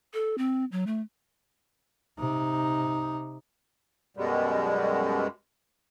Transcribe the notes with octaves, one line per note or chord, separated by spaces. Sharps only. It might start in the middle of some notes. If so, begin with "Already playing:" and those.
A4
C4
F#3
A3
C3 D#4
F#2 B2 G3 G#3